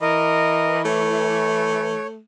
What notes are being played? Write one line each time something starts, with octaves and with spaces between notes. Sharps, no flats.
E3 A#4 D#5
A3 C#5